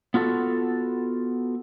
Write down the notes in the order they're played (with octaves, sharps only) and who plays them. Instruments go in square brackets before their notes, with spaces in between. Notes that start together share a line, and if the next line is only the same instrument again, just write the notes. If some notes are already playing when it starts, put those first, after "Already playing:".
[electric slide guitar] B3 F4 F#4 A4